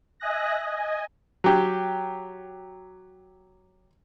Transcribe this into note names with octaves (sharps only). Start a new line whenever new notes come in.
D#5 E5 G#5 D#6 F#6 A#6
D#5 G#5
F#3 G4